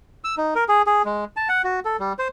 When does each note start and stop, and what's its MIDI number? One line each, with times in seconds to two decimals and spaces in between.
0.24 0.35 88
0.37 0.54 63
0.55 0.64 70
0.69 0.82 68
0.86 1.02 68
1.05 1.25 56
1.37 1.48 81
1.49 1.62 78
1.64 1.80 66
1.85 1.97 69
2.00 2.13 55
2.19 2.28 72